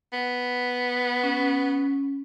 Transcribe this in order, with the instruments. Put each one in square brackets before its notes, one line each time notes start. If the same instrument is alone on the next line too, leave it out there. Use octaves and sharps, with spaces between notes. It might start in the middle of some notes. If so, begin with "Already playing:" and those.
[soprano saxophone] B3
[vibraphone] C#4